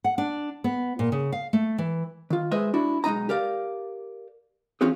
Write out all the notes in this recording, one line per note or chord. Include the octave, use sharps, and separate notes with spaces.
F#5
D4
B3
A#2
C#3
F5
A3
E3
D#3 F4
G#3 B4 C5 D#5 E5
D4 E4 F#4
B1 G#3 D#4 D#5 A#5
G4 A#4 D5 F5
E3 C4 C#4 F4 F#4 G#4